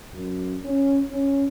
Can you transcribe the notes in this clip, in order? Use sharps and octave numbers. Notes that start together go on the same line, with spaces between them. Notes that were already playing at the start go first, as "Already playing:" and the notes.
F#2
C#4
C#4